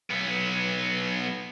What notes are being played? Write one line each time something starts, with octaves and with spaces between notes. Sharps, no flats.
B1 B3